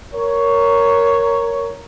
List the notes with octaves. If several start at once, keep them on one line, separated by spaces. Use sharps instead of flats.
A#4 C#5